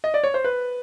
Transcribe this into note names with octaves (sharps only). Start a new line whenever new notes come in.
D#5
D5
C#5
C5
B4